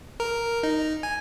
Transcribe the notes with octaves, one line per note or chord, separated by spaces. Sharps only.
A#4
D#4
G#5